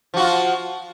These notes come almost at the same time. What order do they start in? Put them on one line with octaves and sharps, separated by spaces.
F3 F#4 F4